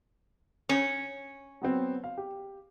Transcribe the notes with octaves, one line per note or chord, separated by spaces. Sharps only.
C#4
F#3 B3 C4
F5
G4